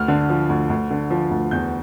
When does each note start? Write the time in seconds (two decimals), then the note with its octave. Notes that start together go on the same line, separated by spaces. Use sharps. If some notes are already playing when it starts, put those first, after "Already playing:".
Already playing: D2 F6
0.08 D3
0.30 F3
0.49 D2
0.70 D2
0.90 D3
1.10 F3
1.31 D2
1.51 E2 G6